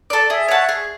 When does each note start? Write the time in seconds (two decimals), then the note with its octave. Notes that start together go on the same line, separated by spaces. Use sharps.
0.10 A4 D5
0.30 G#4 E5
0.48 C#5 F#5 A5
0.69 G#4